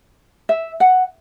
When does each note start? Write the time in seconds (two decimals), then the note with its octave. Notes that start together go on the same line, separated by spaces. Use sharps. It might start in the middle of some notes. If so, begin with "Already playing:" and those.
0.49 E5
0.80 F#5